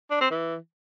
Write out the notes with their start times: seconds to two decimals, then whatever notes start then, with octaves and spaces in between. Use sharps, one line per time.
0.11 D4
0.21 C4
0.31 E3